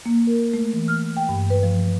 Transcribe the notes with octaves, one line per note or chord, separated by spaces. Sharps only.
A#3
A#4
A3
E3
F6
G5
G2
B4
F3